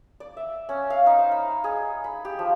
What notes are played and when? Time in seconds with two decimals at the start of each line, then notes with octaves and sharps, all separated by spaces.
0.20 D5
0.37 E5
0.69 C#4
0.90 F5
1.06 D#4
1.19 C5
1.32 B5
1.64 G#4
2.04 B5
2.25 G4
2.39 F3